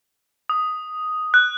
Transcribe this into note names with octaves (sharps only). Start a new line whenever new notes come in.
D#6
F#6